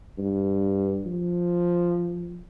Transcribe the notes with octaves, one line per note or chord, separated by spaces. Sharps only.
G2
F3